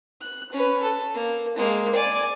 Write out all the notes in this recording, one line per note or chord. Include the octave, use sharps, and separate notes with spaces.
F#6
C#4 B4
A4
A#3
G#3 A#3
D5 G#5